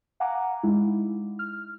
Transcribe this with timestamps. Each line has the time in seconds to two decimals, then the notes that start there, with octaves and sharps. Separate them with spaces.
0.20 F5 F#5 G#5 A#5 D6
0.63 G#3 D#4 E4
1.39 F6